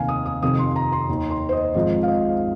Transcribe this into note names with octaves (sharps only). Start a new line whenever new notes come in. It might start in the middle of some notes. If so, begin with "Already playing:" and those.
Already playing: F1 D#2 D#3 F5 G#5
D#6
D#6
F1 F2 C3 D#3 D#6
C6
A#5
C6
D#2 D#3
C6
C5
D#5
G#1 G#2 F3 D#5
F5
D#5